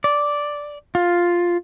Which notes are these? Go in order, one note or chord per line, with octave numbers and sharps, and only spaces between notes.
D5
F4